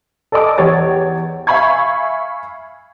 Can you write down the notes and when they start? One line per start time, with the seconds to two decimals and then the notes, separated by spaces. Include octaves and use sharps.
0.32 A4 D5 D#5 G#5 D6 D#6
0.58 E2 G4 C#5 A6
1.47 E5 F5 G#5 B5 C#6 G#6